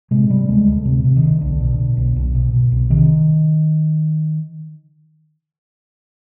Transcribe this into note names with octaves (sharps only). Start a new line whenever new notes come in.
C3 G#3
C3 G3
D2 G#3
D2
C3
C3
D#3
D2
B1 D3
B2
B2
B1
B1
B2
B2
B1
C3 D#3